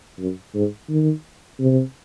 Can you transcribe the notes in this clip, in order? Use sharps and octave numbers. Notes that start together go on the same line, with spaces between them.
F#2
G#2
D#3
C3